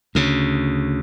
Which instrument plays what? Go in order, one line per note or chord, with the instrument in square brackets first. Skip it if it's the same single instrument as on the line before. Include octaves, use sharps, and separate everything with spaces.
[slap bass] D2 C#3